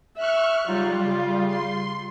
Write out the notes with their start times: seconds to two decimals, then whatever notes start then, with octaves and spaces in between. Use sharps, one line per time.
0.17 E5 C#6 F6 F#6
0.67 C#3 F#3 G3 D#4 F4
1.02 C#3
1.47 C6